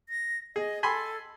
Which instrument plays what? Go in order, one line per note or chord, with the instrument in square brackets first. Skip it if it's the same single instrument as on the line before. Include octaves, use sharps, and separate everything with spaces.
[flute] A#6
[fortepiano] G#4 [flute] D#5
[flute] A4 [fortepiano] G#5 B5 C6